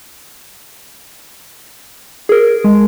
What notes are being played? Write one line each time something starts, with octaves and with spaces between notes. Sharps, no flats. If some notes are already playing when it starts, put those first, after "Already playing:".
G#4 A#4
G#3